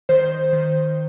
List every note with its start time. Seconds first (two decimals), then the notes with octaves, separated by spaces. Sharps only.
0.09 D#3 C5
0.53 D#3